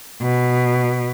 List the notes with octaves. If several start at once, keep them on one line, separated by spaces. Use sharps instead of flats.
B2